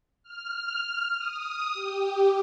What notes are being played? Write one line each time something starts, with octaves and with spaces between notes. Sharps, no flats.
F6
D#6
G4